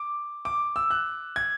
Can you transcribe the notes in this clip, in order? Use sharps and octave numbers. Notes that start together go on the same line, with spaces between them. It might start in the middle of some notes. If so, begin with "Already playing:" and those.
Already playing: D6
D6
E6
F#6
G#6